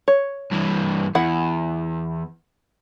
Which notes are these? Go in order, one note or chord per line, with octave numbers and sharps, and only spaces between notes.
C#5
G2 E3
E2 E4 F#5